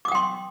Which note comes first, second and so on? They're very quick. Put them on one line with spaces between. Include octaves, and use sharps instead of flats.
D6 D#6 G5 C6